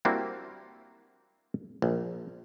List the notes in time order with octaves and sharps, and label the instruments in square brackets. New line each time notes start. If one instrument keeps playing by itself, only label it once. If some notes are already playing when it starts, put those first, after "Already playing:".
[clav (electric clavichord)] G3 A#3 C4 D4 E4 F#4
A#1